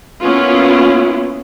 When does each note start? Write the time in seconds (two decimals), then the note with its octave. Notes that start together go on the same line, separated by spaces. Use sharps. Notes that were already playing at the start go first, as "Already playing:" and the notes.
0.23 A#3 B3 C#4 E4 F4